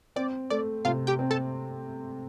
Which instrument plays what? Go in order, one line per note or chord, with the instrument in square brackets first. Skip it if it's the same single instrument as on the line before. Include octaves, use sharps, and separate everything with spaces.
[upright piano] C4 [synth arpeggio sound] D5
[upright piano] A3 [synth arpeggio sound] D5
[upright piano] C3 [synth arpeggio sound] F4 F5
[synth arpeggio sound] G4 G5
[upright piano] C4
[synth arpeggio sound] A4 A5